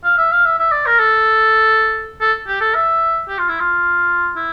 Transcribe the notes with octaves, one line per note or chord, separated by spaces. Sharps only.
F5
E5
F5
E5
E5
D5
A#4
A4
A4
G4
A4
E5
G4
F4
E4
F4
E4